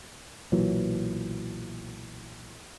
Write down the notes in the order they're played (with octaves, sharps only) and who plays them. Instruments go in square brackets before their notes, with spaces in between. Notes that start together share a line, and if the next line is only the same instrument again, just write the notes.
[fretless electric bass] B1 A#2 E3 F#3